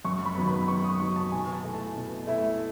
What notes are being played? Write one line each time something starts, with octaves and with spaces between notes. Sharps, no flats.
F#2 C#6
B5
D#3 F#3 B3
B5
F#2 C#6
D#6
D#3 F#3 B3 C#6
A5
B2 G#5
A5
A3 E4
A5
B2
A3 E4